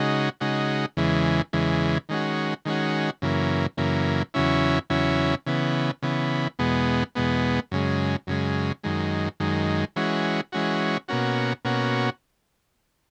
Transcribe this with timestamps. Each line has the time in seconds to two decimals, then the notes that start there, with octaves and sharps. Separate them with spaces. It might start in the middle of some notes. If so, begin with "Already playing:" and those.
Already playing: C#3 G#3 D#4 F#4
0.41 C#3 G#3 D#4 F#4
0.97 E2 C#3 E3 G#3
1.53 E2 C#3 E3 G#3
2.09 D#3 G#3 C#4 F#4
2.65 D#3 G#3 C#4 F#4
3.22 F#2 C#3 E3 A#3
3.77 F#2 C#3 E3 A#3
4.34 E2 C#3 F#3 C#4 E4
4.90 E2 C#3 F#3 C#4 E4
5.46 C#3 E3 B3
6.02 C#3 E3 B3
6.59 E2 B2 G#3 B3
7.15 E2 B2 G#3 B3
7.71 F#2 C#3 G#3
8.27 F#2 C#3 G#3
8.84 F#2 D#3 G#3
9.40 F#2 D#3 G#3
9.96 E3 G#3 C#4 F#4
10.52 E3 G#3 C#4 F#4
11.08 B2 A#3 C#4 F#4
11.65 B2 A#3 C#4 F#4